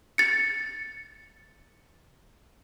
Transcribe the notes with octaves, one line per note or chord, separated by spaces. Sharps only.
A6 C#7